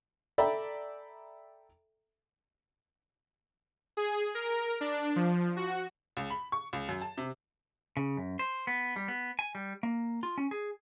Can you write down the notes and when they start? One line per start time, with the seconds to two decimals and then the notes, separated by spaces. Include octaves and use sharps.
0.38 A4 D5 E5 G5 A#5 B5
3.97 G#4
4.35 A#4
4.81 D4
5.16 F3
5.57 F#4
6.17 C#2
6.30 B5
6.52 C#6
6.73 C#2
6.89 F#2
7.02 A5
7.18 C3
7.97 C#3
8.17 F#2
8.39 C5
8.67 B3
8.96 G3
9.08 B3
9.39 G#5
9.55 G3
9.83 A#3
10.23 F4
10.38 C#4
10.51 G#4